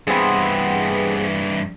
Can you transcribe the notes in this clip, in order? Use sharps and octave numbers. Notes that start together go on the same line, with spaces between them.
G2 E3 B3 C4 G#4